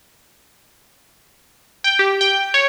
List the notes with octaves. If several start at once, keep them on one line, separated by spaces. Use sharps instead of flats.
G5
G4
G5
C#5